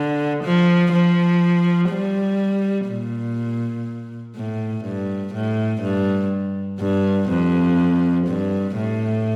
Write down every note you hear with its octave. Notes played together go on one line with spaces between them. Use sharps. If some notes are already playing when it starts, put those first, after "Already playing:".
Already playing: D3
F3
F3
G3
A#2
A2
G2
A2
G2
G2
F2
G2
A2